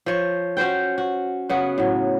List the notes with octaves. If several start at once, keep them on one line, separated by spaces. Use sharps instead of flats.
F3 C#5
C#4 F#4 C5 G5
F#4
C#3 B3 F#4
A2 F#3